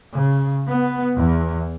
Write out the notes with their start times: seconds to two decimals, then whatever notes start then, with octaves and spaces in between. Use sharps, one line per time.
0.12 C#3
0.69 B3
1.17 E2